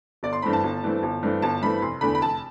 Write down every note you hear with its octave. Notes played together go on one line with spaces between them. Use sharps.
G1 D5
C6
G2 E3 A3 C4 B5
A5
G1
G2 E3 A3 C4
G1
G2 E3 A3 C4
G1 A5
G2 E3 A3 C4 B5
F1 C6
E2 D3 A3 B5
B5
F1 A5